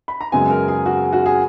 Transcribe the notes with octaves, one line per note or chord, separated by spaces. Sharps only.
B5
A#5
F#2 C#3 G#3 B3 G#5
A#4
G#4
F#4
F#4
G#4